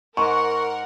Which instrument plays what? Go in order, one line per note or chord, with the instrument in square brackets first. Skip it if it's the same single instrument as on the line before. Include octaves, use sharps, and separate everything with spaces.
[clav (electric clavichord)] G#2 [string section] A#4 F#5 [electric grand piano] C#6